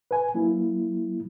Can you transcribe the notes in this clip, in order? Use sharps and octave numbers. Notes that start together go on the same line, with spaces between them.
B4 G#5
F#3 A#3 E4